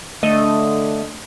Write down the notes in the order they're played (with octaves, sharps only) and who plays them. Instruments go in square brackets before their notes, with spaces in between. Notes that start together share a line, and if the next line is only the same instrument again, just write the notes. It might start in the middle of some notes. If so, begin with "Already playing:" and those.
[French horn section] D3 [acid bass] A3 [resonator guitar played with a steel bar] D#5